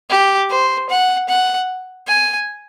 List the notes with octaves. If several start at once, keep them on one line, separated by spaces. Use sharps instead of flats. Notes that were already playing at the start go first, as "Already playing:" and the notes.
G4
C5
F#5
F#5
G#5